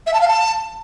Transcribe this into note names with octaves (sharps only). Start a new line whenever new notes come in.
E5
A5
F5
A5